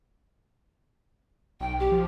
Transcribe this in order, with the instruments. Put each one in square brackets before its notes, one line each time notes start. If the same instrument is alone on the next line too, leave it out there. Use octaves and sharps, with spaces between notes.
[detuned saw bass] B1 [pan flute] G5
[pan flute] G4
[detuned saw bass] F3